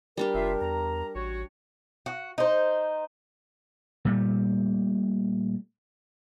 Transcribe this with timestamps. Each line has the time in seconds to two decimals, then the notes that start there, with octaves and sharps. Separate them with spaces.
0.17 G3 D4 G4 A#4
0.34 F1 F4 E5
0.61 E2 A#5
1.15 A1 F#4 C#5
2.06 F#4
2.38 D#4 C5
4.05 A#2 G3 A3